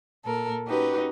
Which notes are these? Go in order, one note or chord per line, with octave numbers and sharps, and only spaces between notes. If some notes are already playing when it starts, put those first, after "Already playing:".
A#2 A4 A#4
C#4 D#4 F#4 G4 B4